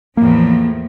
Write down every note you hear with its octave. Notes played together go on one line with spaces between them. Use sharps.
E2 A2 F3 A#3